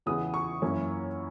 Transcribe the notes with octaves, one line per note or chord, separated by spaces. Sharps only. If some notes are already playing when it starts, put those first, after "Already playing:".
E2 C#3 E3 B3 D#6
C#6
F#2 E3 A#3 C#4